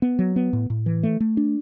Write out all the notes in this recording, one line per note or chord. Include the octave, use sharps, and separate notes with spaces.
B3
F#3
B3
A2
A2
E3
A3
A3
D4